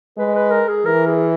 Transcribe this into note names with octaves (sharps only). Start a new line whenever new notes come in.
G#3 B4
B4
A#4
G#4
E3 A#4
G#4